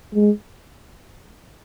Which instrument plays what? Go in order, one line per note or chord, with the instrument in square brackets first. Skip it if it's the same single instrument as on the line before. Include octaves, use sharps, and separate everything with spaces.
[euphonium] G#3